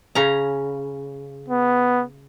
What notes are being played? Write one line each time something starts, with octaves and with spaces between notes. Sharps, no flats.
C#3 C#4 A#5
B3